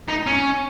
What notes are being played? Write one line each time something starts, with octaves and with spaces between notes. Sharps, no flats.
D#4
C#4